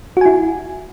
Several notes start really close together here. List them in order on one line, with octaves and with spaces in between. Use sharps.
F#4 G#5 E4